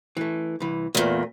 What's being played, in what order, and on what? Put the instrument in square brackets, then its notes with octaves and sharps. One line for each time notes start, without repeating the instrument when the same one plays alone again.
[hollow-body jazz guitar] E3 A3
C2 E3
[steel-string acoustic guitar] E2 A#2 [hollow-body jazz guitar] A3 A#3